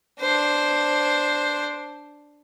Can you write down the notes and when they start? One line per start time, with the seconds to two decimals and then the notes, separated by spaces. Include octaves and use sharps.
0.21 D4 C5